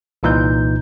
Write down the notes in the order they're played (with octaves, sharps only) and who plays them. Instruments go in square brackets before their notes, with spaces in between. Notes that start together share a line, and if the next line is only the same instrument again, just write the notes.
[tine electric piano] C2 A#2 E3 D#4 G6